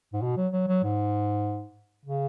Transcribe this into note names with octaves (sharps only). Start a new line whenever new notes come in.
G#2
B2
F#3
F#3
F#3
G#2
C#3